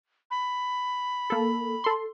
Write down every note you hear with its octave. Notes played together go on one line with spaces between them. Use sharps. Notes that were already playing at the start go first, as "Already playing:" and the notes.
B5
A#3 A4
A4 C6